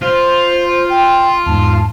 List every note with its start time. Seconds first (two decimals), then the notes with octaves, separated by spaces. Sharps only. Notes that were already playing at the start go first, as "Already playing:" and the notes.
0.02 F4 C5
0.90 G5
1.46 E2 G#2 A5